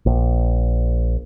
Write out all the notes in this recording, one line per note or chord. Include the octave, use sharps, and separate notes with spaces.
A#1